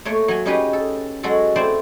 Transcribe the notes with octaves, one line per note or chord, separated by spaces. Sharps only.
A3 A#3 C#5
F#3 G#5
C#4 D#4 G4 G#4 B4 D#5
A4
F#3 G#3 F#4 A4
A3 C4 E4 C5 D5 E5